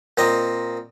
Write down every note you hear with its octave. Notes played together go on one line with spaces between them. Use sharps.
A#2 C4 D#5